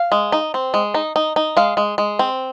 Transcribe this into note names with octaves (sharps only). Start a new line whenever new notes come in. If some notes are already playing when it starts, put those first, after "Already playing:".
Already playing: F5
G#3
D#4
C4
G#3
D#4
D#4
D#4
G#3 F5
G#3
G#3
C4